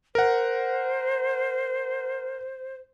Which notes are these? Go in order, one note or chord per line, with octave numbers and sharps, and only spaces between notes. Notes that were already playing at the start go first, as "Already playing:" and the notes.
A#4 C5 F#5